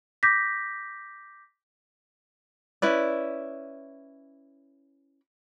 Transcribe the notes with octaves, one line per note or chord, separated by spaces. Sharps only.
D6 G6 A#6 B6
C#4 E4 B4 D5